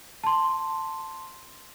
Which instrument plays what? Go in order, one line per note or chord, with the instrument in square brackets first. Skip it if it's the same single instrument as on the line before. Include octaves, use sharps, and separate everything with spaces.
[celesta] A5 C6